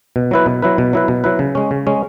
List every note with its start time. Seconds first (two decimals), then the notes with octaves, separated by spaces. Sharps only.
0.16 B2
0.31 F#3 E4 B4
0.46 B2
0.62 F#3 E4 B4
0.78 B2
0.93 F#3 E4 B4
1.08 B2
1.24 F#3 E4 B4
1.39 C#3
1.55 G#3 C#4
1.71 C#3
1.87 G#3 C#4